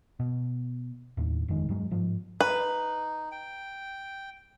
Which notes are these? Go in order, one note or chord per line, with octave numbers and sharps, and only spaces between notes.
B2
D#2 A2
G1 F2 D#3 G#3
G2 F#3 G#3
G#2 F3
D#4 B4
G5